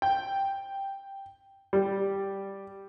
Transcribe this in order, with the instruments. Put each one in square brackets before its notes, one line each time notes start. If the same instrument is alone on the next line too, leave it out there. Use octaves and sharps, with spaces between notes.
[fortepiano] G5
G3